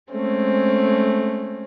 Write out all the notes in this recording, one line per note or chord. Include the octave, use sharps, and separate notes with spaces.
G#3 A3 C4 C#4